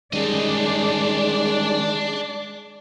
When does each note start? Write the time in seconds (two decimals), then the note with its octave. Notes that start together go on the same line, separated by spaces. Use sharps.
0.13 D#3 G3 G#3 C#4 D4 D5 D#5